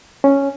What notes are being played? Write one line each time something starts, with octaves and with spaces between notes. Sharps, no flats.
C#4